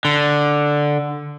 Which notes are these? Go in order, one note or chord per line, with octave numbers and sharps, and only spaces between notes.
D3